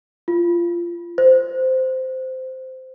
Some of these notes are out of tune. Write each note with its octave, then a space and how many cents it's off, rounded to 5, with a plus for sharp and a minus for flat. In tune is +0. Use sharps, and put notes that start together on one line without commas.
F4 -20
C5 -10